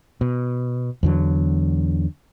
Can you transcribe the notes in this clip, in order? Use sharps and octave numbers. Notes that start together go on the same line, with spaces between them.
B2
E2 D3 F#3